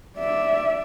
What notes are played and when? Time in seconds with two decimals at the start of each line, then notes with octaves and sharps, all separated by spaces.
0.18 D5 E5